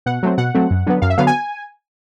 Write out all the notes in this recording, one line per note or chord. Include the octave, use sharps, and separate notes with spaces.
B2 F#5
F#3 A3 C4
B2 F#5
F#3 A3 C4
F#2
D3 F#3 B3
F#2 F5
E5
D3 F#3 B3 F5
G#5